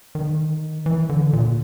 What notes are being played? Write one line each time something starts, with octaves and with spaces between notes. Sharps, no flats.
D#3
E3
D3
A#2